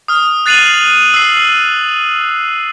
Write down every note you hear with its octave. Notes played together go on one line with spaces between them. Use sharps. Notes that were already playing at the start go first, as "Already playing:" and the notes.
D#6 F6
F#6 A6 C7 D#7 F7 F#7
E6 C7